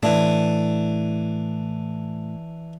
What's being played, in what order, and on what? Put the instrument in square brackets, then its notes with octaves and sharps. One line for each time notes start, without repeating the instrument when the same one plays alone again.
[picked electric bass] A2 [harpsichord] E3 D4